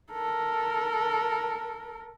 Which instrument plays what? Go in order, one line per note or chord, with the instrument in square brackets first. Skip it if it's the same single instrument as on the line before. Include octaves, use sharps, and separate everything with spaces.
[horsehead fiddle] A4 A#4